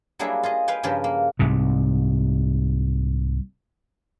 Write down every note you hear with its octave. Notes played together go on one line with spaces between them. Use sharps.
F#3 G3 A#3 D4 E4 G#4
F4 G#4 D#5
B4 F5 G5 G#5
G2 C#3 F3 G4 A#4 B4
A#3
C2 G#2 C3